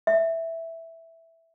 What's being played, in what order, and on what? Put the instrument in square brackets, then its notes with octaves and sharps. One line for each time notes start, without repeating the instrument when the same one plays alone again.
[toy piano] E5